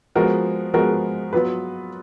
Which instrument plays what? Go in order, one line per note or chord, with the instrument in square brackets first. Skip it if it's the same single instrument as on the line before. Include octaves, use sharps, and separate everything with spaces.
[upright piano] F3 G#3 B3 F#4 A#4
F3 G#3 B3 F#4 A#4
F#3 B3 F4 B4